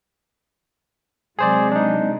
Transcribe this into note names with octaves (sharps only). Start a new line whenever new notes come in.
C3 F#3 G#3 G#4 C5 D5
D4 D#4